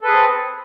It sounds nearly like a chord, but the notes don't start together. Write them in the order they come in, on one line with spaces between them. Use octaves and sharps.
A4 B4 G#4 C4